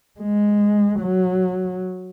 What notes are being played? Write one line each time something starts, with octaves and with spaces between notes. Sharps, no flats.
G#3
F#3